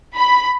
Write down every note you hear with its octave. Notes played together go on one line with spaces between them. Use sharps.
B5